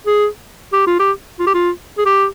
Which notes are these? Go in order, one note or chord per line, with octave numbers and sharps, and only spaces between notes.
G#4
G4
F4
G4
F4
G4
F4
G#4
G4